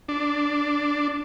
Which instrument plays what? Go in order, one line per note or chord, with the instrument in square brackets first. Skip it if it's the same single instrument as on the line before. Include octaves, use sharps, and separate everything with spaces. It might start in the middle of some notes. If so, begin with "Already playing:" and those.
[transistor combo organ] D4